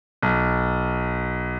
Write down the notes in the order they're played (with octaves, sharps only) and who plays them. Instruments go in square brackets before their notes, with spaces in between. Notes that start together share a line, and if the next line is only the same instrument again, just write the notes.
[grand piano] B1